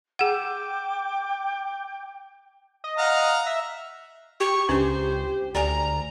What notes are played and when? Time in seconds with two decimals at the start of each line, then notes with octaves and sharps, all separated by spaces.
0.19 G#4 F#5 G5 D6
2.84 D#5
2.98 F5 F#5 A#5
3.46 E5
4.40 G4 C#6
4.69 C#2 C#4 D4 C5
5.55 D2 D5 G#5 A#5